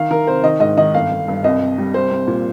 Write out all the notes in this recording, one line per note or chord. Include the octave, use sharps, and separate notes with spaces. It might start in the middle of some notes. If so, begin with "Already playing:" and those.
Already playing: D#3 F5
D#3 A#4
C3 C5
D#3 D#5
G#2 D#5
D#3 D#5
G1 F5
G1
G2
C2 D#5
C2
G3
C2 C5
C2
A#2